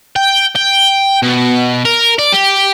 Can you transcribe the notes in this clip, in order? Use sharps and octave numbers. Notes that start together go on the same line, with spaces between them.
G5
G5
B2
A#4
D5
G4